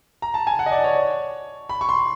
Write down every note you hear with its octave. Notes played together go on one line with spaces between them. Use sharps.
A#5
A5
G#5
F#5
D#5
D5
C#5
B5
C#6
C6